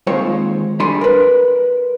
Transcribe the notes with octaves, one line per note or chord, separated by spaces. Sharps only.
D#2 G#3 C4 F4 C5 C#5
G3 D4 A4 G#5 B5 C6
A#4 B4